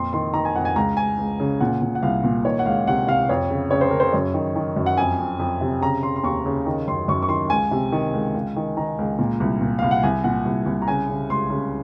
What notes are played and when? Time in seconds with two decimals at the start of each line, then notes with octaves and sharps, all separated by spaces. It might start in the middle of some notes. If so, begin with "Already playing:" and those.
Already playing: F2 A#2 C6
0.13 D#3 C6
0.34 D#3 A#5
0.45 G#5
0.55 F2 F#5
0.65 G#5
0.76 C#2 A#5
0.97 C#2 G#5
1.18 C#2
1.40 C#3
1.60 A#2 F#5
1.82 A#2
1.95 F#5
2.03 C2 F5
2.24 A#2
2.45 D#3 C#5
2.59 F#5
2.66 C#2 F5
2.87 C3 F#5
3.07 C3 F5
3.29 F2 C#5
3.50 C#3
3.71 C#3 C#5
3.81 C5
3.91 C#3 A#4
4.00 C5
4.13 F#2 C#5
4.34 D#3
4.56 D#3
4.76 F#2
4.86 F#5
4.97 F2 G#5
5.19 F2
5.39 F2
5.61 C3
5.81 C#3 A#5
6.03 C#3 C6
6.16 C6
6.23 D#2 C#6
6.46 C#3
6.66 D#3
6.87 F#2 C6
7.08 F#2 C#6
7.22 C#6
7.29 D#3 C6
7.50 C#2 G#5
7.71 C3
7.92 D#3
8.13 C#2
8.34 C#2
8.56 D#3
8.77 D#3 A#5
8.99 C#2
9.19 A#2
9.40 C2
9.61 A#2
9.79 C2 F5
9.91 F#5
10.03 C2 G#5
10.24 A#2 F#5
10.46 C2
10.66 C2
10.82 A#5
10.88 C#3 G#5
11.09 C#3
11.30 C#2 C6
11.50 C#3